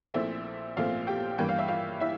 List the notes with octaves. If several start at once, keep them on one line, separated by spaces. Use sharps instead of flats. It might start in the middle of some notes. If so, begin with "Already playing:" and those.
A#1 A#2 A3 C4 E4 E5
A#1 A#2 A3 C4 F4 F5
G4 G5
G2 E3 A#3 G5
F5
E5
F4 F5
E4 E5